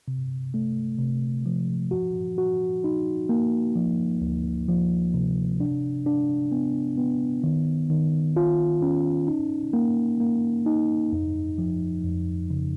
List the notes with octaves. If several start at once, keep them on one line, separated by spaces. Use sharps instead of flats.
C3
A3
C3
F3
F#4
F#4
D#4
A#3
F3
D2
F3
C3
D4
D4
B3
B3
D#3
D#3
F4
C#4
D#4
A#3
A#3
D#4
F2
F3
F2
C#3